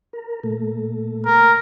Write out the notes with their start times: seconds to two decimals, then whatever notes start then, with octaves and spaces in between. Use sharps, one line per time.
0.13 A#4
0.43 A#2 A3
1.26 A#4